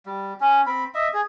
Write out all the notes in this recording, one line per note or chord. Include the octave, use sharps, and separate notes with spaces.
G3
C#4
C4 B5
D#5 E5
G#4